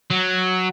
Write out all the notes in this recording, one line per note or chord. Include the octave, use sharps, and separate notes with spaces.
F#3